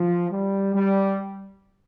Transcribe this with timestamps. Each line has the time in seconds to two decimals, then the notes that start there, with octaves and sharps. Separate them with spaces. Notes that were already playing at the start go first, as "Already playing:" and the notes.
Already playing: F3
0.31 G3
0.75 G3